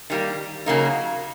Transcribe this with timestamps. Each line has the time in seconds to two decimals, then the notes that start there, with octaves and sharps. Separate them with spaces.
0.10 D#3 G3 A#3
0.66 C#3 F#3 A#3 D#4